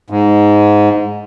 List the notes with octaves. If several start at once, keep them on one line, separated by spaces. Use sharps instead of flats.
G#2